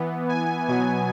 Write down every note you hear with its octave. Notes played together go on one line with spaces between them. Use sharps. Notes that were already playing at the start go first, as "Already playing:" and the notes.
Already playing: E3 B3
G#5
B2 F#3 B3 G#5